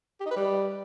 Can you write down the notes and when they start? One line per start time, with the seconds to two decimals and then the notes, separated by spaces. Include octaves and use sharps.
0.20 G4
0.25 D#4
0.31 B4
0.36 G3